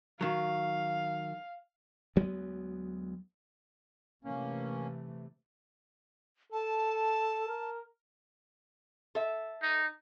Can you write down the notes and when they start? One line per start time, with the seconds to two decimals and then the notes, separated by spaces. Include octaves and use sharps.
0.21 D#3 F#3 F5
2.16 D2 F#3 G#3 B3
4.24 C3 E3 A3 A#3 C#4
6.52 A4 A5
7.48 A#4
9.15 A4 E5
9.62 D#4